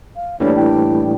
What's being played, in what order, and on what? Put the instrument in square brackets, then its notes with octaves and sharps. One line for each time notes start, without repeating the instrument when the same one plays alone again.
[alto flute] F5
[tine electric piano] A2 E3 G3 [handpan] A#3 D4 [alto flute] C#5
[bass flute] E4 [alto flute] G5